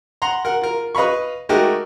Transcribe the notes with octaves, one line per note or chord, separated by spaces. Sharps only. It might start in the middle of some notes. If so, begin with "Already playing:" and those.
F#5 A#5 C6
A#4 F#5
F4 A#4
B4 D#5 F5 B5 C#6
G#3 A3 D#4 F#4 G4 A#4